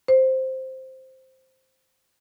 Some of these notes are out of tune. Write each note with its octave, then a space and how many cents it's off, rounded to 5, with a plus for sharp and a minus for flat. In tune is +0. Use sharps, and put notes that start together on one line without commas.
C5 +0